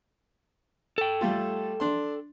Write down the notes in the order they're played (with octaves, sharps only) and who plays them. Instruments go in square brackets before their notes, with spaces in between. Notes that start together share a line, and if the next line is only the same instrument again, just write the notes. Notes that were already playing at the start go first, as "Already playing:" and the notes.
[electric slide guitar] A4 G5
[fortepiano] G3 A3 F4
D4 C6